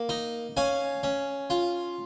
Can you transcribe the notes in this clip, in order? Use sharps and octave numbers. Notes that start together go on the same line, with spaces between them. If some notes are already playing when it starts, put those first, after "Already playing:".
Already playing: A#3
D#4
C#4 F5 G#5
C#4
F4